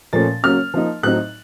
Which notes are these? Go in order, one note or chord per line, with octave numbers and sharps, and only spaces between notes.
A#2 F3 A3 C#4 A6
C#3 F#3 A#3 C#4 F6
F3 A#3 D#4
A2 F#3 C4 D#4 F#6